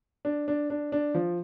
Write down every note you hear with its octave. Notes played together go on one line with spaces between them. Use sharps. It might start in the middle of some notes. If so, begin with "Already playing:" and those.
D4
D4
D4
D4
F3